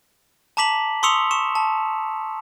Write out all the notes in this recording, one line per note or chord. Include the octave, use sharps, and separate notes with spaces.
A5 A#5 D6 B6 F#7
C6 C#6 D#6 E6 C#7 F7
C#6 E7
A5